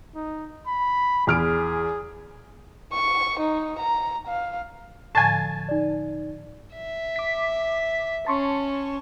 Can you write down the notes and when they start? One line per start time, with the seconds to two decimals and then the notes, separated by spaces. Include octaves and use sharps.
0.15 D#4
0.67 B5
1.27 E2 G#4 F6 D7
2.93 C#6
3.40 D#4
3.79 A#5
4.27 F5
5.15 A2 D3 F3 G#5 A5
5.69 D#4 D5
6.75 E5
7.16 D6 B6
8.26 C#4 A5 C6 C#6